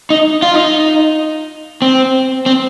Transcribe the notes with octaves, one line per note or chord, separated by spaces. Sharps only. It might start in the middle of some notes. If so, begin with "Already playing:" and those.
D#4
F4
D#4
C4
C4